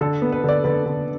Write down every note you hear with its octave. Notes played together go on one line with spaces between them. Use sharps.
D3 A4
B3
B4
D3 D5
D3 B4
D3